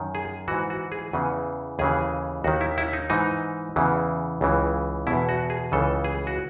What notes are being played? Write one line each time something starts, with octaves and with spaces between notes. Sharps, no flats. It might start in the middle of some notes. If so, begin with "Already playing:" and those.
Already playing: F#2 D#3
G#4
G#2 E3 F#4
F#4
G#4
E2 C#3 E3
D#2 C#3 E3 G#4
D#2 D#3 F#4
E4
E4
D#4
G#2 E3 D#4
E2 C#3 E3
C#2 C#3 E3
E2 B2 E4
F#4
G#4
C#2 C#3 E3 A4
G#4
F#4